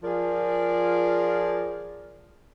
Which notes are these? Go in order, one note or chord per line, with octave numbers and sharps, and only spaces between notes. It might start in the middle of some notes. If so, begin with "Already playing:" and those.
F3 F4 G#4 A#4 D5